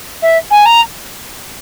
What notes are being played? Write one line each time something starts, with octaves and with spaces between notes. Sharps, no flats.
E5
G#5
A#5